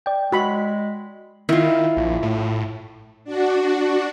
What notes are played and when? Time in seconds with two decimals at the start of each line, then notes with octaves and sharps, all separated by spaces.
0.06 D5 G5
0.32 G#3 F#4 B5
1.49 D#3 E4 F4
1.97 A#1
2.22 A2
3.24 D4 F#4